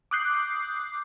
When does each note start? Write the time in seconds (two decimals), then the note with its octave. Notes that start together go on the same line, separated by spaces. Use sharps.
0.11 D6 D#6 F#6 G6 C7